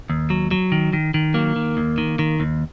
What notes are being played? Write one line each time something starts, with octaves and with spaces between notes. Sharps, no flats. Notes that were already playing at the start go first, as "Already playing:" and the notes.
D#2
F#3
F#3
D#3
D#3
D#3
F#3 A#3
D#3
D#2
D#3
D#3
D#2